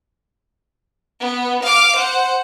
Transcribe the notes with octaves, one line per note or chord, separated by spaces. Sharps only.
B3
F5 D6
C5 F#5